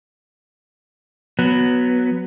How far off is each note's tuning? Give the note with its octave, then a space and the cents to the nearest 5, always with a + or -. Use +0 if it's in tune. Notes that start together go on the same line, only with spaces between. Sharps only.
F#3 +0 B3 +0